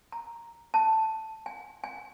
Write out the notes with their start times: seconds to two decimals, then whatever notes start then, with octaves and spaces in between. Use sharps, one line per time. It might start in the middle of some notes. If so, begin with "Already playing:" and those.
0.12 A#5
0.74 A5
1.46 G#5
1.84 G#5